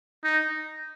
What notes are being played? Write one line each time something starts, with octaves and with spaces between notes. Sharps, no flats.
D#4